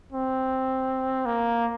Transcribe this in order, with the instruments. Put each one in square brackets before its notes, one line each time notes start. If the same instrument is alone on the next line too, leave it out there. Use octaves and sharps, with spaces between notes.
[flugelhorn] C4
A#3